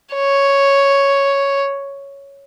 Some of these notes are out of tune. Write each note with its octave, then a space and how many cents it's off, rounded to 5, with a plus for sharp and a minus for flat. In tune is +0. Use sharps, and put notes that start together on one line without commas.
C#5 +0